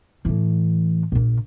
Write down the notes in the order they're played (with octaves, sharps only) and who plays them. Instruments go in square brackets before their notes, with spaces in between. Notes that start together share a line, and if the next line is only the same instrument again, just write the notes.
[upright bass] A2 E3
A#1 A#2